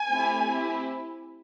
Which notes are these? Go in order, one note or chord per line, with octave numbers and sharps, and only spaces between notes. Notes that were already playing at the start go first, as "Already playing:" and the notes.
Already playing: G#5
A3 C4 E4 G4
C4 E4 G4